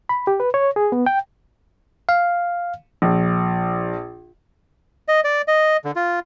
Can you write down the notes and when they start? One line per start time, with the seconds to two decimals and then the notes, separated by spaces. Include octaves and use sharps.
0.09 B5
0.27 G4
0.40 B4
0.54 C#5
0.76 G#4
0.92 B3
1.06 G5
2.09 F5
3.02 A#1
5.08 D#5
5.24 D5
5.48 D#5
5.85 D3
5.96 F4